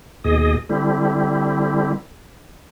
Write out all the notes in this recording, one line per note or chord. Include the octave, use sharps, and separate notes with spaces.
D#2 B2 G#4 D#5
D3 G3 C4 E4